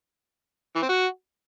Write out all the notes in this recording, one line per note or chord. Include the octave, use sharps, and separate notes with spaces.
E3
C4
F#4